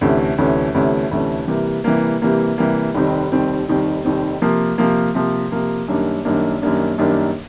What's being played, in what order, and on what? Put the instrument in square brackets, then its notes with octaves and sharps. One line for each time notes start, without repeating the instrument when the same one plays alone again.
[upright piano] D2 C3 E3 A3 C#4
D2 C3 E3 A3 C#4
D2 C3 E3 A3 C#4
D2 C3 E3 A3 C#4
C3 E3 G3 A#3
C3 E3 G3 A#3
C3 E3 G3 A#3
C3 E3 G3 A#3
F1 D#2 D#3 G3 C4
F1 D#2 D#3 G3 C4
F1 D#2 D#3 G3 C4
F1 D#2 D#3 G3 C4
C3 F3 A#3
C3 F3 A#3
C3 F3 A#3
C3 F3 A#3
F#2 D#3 G3 A#3 D4
F#2 D#3 G3 A#3 D4
F#2 D#3 G3 A#3 D4
F#2 D#3 G3 A#3 D4